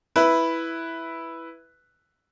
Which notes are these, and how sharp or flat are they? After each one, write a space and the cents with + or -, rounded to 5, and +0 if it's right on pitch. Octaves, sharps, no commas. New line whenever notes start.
E4 +0 B4 +0